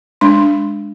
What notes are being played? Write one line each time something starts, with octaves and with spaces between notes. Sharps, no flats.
G#3 D4 C6